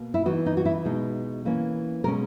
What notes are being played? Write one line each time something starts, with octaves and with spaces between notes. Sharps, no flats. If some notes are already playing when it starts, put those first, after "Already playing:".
Already playing: B2 A#3
E4
E3 B3 D#4 F#4
D#4
F#4
E4
B2 G#3 D#4
E3 A#3 C#4
B2 G#3 C#4 A#4